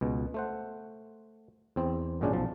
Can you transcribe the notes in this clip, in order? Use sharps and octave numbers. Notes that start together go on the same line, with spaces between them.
C#2 B2
A3 C5 F#5
E2 C4
G#1 F#2 A#2 G#3 C#4 D4
B1 F3 A5